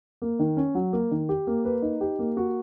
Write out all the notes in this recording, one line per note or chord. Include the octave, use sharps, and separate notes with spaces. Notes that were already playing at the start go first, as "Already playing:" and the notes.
A#3
D#3
C#4
F#3
A#3
D#3
G4
A#3
B4
D#4
G4
A#3
F#4